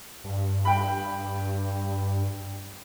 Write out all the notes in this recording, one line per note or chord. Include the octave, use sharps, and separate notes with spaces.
G2
G5 B5